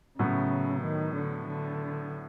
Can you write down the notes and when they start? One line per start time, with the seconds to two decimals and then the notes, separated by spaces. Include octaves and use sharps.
0.19 A2 C#3 F#3 B3 E4
0.83 D#3
1.15 D3
1.46 D3